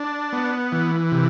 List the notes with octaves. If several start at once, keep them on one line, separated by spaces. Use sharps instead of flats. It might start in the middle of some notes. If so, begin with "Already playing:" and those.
Already playing: D4
B3
E3
C3